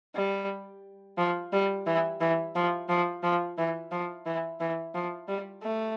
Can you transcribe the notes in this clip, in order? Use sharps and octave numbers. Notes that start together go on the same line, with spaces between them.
G3
F3
G3
E3
E3
F3
F3
F3
E3
F3
E3
E3
F3
G3
A3